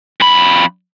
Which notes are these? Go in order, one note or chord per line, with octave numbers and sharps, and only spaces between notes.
F2 B5